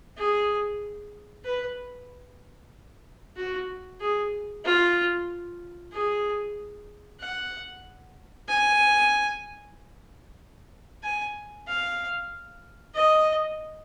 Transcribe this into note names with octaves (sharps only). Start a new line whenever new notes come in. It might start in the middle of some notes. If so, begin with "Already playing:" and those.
G#4
B4
F#4
G#4
F4
G#4
F#5
G#5
G#5
F5
D#5